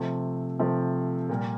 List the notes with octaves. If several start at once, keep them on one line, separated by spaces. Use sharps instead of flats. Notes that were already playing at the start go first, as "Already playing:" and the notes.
Already playing: C3 F3 A3
C3 F3 A3
A#2 G3 A#3